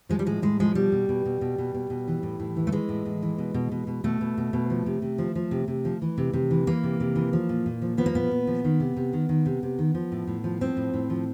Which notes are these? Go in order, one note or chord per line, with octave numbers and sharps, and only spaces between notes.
F3 G#3
G3
A2 G#3
A2 G#3
F3 G#3
B2 G3
B2
B2
B2
B2
B2
B2
B2
E3
A2
A2
E3
A3
E3 G#3
A2
A2
E3
B2
B2
B2
B2
B2 A3
B2
B2
B2
F3
C3
C3
F3
F3
C3
C3
F3
E3
C3
C3
E3
E3 A#3
C3
C3
E3
F3
A#2
A#2
F3
F3 B3
A#3
A#2 B3
A#2
F3
D#3
C3
C3
D#3
D#3
C3
C3
D#3
F3
A2
A2
F3
F3 C4
A2
A2
F3